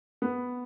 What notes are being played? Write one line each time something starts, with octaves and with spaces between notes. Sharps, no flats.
B3